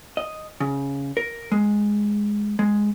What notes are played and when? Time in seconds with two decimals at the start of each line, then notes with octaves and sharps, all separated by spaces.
0.17 D#5
0.60 C#3
1.17 A#4
1.52 G#3
2.59 G#3